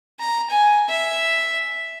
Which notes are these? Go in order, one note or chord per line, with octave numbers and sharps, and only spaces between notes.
A#5
G#5
E5